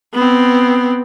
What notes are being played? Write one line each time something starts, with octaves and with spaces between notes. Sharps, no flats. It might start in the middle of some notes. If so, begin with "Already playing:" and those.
B3 C4